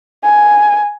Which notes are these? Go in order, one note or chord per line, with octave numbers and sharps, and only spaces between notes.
G#5